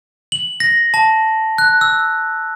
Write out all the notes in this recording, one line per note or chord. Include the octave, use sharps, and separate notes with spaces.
F#7
A#6
A5
F#6
E6